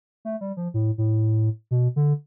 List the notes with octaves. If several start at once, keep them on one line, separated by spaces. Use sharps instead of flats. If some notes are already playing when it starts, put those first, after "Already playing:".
A3
G3
F3
A2
A2
B2
D3